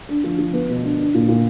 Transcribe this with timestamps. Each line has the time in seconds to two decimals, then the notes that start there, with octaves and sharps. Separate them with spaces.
0.09 D4
0.24 F3
0.38 F3
0.53 B3
0.69 B2
0.83 D4
0.99 D4
1.14 A#2
1.28 A#2